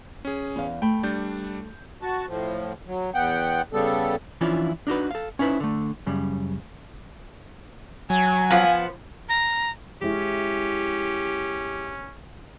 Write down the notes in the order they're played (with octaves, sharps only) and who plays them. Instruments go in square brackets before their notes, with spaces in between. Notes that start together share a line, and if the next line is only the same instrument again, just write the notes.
[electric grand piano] C#4 G#4
[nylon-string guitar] E2 F5
[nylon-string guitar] A3 [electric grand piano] G5 B5
[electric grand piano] G3 D4 G6
[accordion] F#4 A5
A2 F3
F#3
E2 B3 F#5 G5
C#3 G3 B3 A4
[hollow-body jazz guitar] E3 F3 C#4 D4 E4 F4
D4 D#4 F#4 B4
A4 F5
C#4 D#4 E4 B4 C5
D3 A3
F#2 C#3 G3
[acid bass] F#3 [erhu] G#5
[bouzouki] F3 B3 [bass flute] F5
[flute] A#5
[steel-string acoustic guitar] G#3 E4 [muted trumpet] C#4 [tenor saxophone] G4